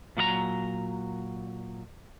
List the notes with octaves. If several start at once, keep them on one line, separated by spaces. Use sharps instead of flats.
A#2 F#3 D5 A#5